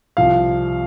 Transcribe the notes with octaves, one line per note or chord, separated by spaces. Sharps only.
C2 C3 F3 F5